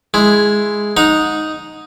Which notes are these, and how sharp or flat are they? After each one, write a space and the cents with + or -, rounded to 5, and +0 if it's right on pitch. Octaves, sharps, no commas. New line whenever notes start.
G#3 +0 E4 +0
D#4 +0 F#5 -30 A#5 +0